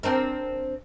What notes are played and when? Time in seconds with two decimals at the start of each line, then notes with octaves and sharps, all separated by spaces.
0.03 C4 D4 A#4